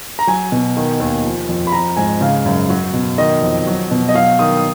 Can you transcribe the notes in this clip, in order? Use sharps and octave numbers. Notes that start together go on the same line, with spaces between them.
A#5
F#3 G#5
B2
D#3
D#2
F3
F2
B5
F3 A#5
G#2 G#5
C#3 F5
F#2
F#3
B2
D#3 D#5
F2
F#3
B2
D#5
F#3 F5
D#3 D#6
D#6